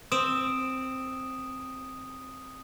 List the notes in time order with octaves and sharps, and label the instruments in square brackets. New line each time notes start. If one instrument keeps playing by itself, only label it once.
[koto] C4 [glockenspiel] D#6 D7 E7